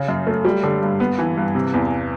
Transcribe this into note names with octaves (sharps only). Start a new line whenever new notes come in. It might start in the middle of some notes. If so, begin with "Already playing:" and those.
Already playing: C#3
F#2
A3
G3
D3
G2
B3
E3
G2
C3
E2